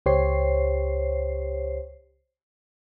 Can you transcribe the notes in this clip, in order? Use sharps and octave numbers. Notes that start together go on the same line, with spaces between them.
C#2 G4 C5 C#5 C7